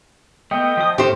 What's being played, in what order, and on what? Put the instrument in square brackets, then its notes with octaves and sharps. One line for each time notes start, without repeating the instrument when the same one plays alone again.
[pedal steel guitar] A3 B3 [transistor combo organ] D#5 G5
[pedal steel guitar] F3 D#6
[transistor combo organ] A2 [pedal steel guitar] C4 C#4 [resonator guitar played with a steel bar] G4 C5